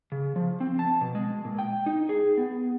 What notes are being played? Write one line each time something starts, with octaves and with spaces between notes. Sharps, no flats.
C#3
F3
C4
A5
B2
G#3
A#2
G5
D#4
G#4
B3